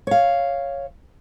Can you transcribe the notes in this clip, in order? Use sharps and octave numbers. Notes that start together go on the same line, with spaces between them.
C#5 F5